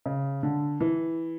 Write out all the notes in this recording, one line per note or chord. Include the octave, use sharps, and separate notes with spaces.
C#3
D3
E3